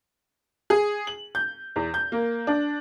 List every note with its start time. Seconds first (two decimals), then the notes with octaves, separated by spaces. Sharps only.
0.70 G#4
1.07 F#7
1.35 G6
1.76 E2
1.94 G6
2.12 A#3
2.47 D4